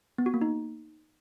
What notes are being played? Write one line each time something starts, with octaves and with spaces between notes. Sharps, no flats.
B3
F#4
A#3
D#4